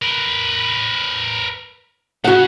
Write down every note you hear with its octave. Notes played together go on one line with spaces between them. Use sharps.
A#4 B4
C#3 F#4 F#5